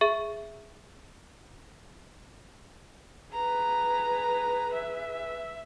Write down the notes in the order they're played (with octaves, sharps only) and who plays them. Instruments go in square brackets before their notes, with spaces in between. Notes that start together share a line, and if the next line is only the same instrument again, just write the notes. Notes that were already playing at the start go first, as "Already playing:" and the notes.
[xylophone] G#4 E5 C#6
[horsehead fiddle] G#4 B4 [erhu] A#5
[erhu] E5